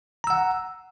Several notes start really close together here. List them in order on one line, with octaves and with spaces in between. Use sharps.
A#5 E6 F#5